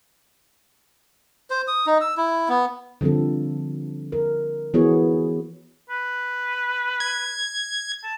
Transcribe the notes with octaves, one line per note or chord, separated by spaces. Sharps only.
C5
D#6
D#4
E6
E4
B3
D3 F3 G3 C4 A4
A#4
E3 B3 F#4 G#4 C#5
B4
G#6
A5